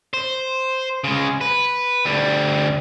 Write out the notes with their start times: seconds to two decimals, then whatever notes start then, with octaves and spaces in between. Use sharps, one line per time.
0.14 C5
1.04 C#3 G#3
1.41 B4
2.05 D2 G3